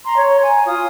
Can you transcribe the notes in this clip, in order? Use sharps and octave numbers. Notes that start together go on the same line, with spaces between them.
A#5 C6
C#5
G#5 A#5
F4 D#6